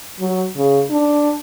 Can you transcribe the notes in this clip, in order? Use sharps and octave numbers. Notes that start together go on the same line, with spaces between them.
F#3
C#3
D4